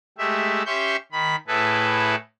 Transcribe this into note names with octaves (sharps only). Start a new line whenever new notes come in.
G#3 A3 G4 E5
C#4 G4 E5 C6 C#6 G6
D#3 B5
A2 E4 G#4 A4 B4